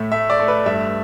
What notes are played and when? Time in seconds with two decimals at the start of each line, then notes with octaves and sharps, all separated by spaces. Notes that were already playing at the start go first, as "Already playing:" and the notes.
Already playing: A2 A3 E5
0.12 A3 E5
0.30 D5
0.39 A3
0.48 B4
0.66 G2 E5